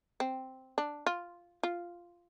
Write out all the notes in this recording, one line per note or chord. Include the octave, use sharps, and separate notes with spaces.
C4
D4
F4
F4